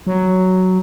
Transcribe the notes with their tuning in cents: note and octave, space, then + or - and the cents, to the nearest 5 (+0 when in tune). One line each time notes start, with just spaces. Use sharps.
F#3 +5